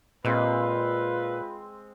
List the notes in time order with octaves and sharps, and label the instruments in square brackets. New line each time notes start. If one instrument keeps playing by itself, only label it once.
[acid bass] A#2 [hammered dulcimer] G#3 C4 [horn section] F4 B4